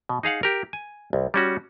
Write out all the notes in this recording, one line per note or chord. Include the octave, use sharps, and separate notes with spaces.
B2
D#4 G#4 F5 F#5
G4 A#4
G#5
C2
G3 C#4 F#4